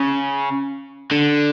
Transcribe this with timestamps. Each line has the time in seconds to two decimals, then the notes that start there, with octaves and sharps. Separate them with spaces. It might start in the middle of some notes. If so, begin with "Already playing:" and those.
Already playing: C#3
1.11 D3